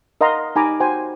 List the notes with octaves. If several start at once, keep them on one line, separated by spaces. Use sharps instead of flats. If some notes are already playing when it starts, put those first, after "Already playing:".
A#4 D#5 F5 F#5 A#5 C6
D#4 G4 G#5 A#5 B5 D6
F#4 C5 G5 G#5